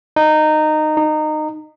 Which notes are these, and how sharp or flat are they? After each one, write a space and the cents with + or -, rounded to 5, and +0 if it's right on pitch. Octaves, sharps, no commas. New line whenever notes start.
D#4 -15
D#4 -20